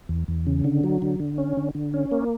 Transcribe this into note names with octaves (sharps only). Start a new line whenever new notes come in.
E2
E2
C#3
D3
F#3
D3
D3
C#4
D3
D3
C#4
A#3